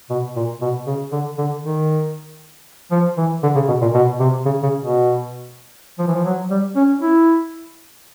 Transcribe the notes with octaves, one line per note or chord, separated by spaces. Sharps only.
B2
A#2
B2
C#3
D3
D3
D#3
F3
E3
D3
C#3
B2
A#2
B2
C3
C#3
C#3
B2
F3
E3
F3
F#3
G3
C#4
E4